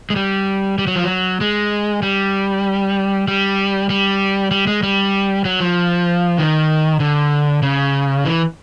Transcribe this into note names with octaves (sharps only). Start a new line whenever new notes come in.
G#3
G3
G3
F#3
F3
F#3
G#3
G3
G3
G3
G3
G#3
G3
F#3
F3
D#3
D3
C#3
E3